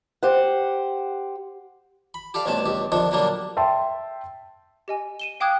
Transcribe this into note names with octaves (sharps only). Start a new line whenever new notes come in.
G4 C5 F#5
B5
G4 A4 D5 F5
A1 G2 B2 C4 C#4 A5
C#2 G2 G4
F2 D3 D#3 F3 D4
A#2 D3 F#3 G3 A#3 D4
E5 G5 A5 C6
G4 D#5 G#5
D#7 E7 G7
F5 G5 D6 D#6 F#6 G#6